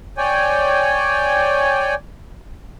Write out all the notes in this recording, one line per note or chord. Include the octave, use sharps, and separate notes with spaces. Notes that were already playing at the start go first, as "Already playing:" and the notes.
C#5 D5 G5 G#5